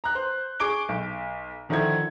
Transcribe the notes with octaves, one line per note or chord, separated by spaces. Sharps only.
A#5 F#6
C5
G#4 C#6 D6 D7 G7
B1
D3 D#3 F3 E4 A4 G#6